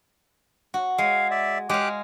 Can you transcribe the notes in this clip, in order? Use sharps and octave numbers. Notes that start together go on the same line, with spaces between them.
F#4
G#3 F5
D5 E5
G#3 G4 F5 D6 F#6